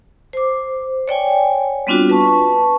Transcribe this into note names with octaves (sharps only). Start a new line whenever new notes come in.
C5 D6
C#5 D5 G5 G#5
G3 B3 C4 D4 F4 F#4
B4 A5 C#6